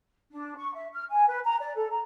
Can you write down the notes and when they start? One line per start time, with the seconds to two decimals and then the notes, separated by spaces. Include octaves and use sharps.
0.31 D4
0.57 C#6
0.74 E5
0.93 F6
1.10 G#5
1.27 B4
1.45 A#5
1.60 D5
1.75 A4
1.90 A#5